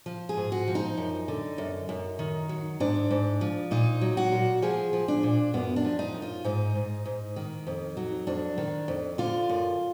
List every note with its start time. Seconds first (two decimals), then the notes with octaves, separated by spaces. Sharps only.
0.06 F3
0.29 G#4
0.37 G#2
0.52 F#4
0.68 F3
0.75 D#4
0.98 F#2
1.28 D3
1.58 F#2
1.89 F#2
2.19 D#3
2.49 F#3
2.80 G#2 D4
3.11 G#2
3.41 F3
3.71 A#2 D#4
4.01 F#3
4.17 F#4
4.32 A#2
4.62 F3 G#4
4.93 F3
5.08 D4
5.23 A#2
5.54 F#2 B3
5.76 D4
5.85 F3
5.99 D#4
6.14 F#2
6.22 F4
6.44 G#2 D#4
6.75 G#2
7.05 G#2
7.36 D#3
7.67 F2
7.97 F#3
8.27 F2 D4
8.58 D#3
8.88 F2
9.18 D3 F4
9.49 F#2